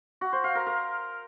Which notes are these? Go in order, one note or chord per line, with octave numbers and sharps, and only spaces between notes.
F#4
C5
F5
A#4
A#4